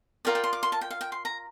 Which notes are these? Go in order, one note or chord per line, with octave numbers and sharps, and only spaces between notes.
F4 A#4 D5 G5
G5
C6
D6
C6
A5
G5
F5
G5
C6
A#5